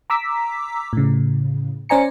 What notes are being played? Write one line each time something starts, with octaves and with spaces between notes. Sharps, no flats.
A#5 D6 E6 B6
A2 C#3
C#4 C5 D5 G#5 A#5 C#7